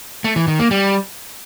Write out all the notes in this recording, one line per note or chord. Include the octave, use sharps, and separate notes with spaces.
A3
E3
D#3
A#3
G3